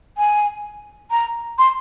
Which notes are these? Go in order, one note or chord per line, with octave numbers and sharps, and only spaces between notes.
G#5
A#5
C6